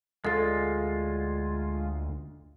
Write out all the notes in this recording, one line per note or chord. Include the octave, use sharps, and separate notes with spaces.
D2 G#3 F4 A4 A6